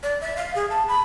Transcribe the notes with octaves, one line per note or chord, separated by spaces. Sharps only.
D5
E5
F5
G#4
A5
B5